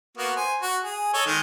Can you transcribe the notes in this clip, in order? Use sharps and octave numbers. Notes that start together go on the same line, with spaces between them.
A#3 B3 F#4
C5 G#5
F#4
G#4
A4 C#5 D#5
D#3 G#3